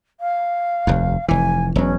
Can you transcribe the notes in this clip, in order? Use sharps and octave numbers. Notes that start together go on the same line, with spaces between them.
F5
F1 D#2
F1 E3 G#5
E1 F#3 C#4